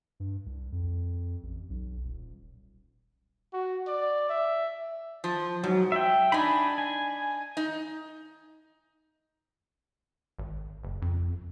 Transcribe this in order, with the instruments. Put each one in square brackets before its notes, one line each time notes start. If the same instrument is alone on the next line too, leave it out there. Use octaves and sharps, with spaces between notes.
[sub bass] G2
C2
F2
A1
B1
D#1
[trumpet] F#4
D5
E5
[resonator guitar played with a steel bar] F3
[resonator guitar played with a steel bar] G#2 [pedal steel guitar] F#3
[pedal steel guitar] E5 G5
[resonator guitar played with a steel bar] D4 D#4 [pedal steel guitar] G#5 B5
[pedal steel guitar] G#5
[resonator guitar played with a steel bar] D#4
[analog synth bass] G#1
F#1
F2